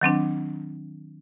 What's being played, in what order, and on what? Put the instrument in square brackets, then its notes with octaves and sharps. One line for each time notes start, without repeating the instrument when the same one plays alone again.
[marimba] D#3 F#3 C4 D4